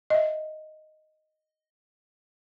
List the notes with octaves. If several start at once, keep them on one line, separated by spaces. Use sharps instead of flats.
D#5 E5